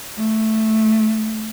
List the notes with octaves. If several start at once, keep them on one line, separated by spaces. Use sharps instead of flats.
A3